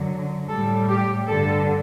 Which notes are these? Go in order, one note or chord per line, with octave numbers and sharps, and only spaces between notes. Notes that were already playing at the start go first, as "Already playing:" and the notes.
Already playing: F#2 D3 F#3
A2 G3 A4
G4
G2 D3 G3 A4